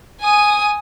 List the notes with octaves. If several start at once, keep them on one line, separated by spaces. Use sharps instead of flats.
G#5 D#6